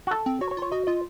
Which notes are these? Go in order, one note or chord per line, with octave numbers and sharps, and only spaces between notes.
F#4
A4
C4
F#4 C#5
C#5
F4
C#5
F#4 D#5
F4 D#5